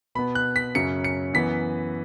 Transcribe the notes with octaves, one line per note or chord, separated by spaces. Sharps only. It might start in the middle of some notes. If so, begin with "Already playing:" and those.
B2 B3 B5
F#6
B6
F#2 C#3 F#3 C#4 C#7
C#7
F#2 E3 B3 B6